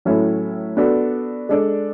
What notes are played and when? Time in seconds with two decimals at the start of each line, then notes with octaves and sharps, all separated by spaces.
0.05 A2 F#3 C#4 E4 A4
0.77 B3 D4 F#4 A4
1.49 G#3 D4 A4 D5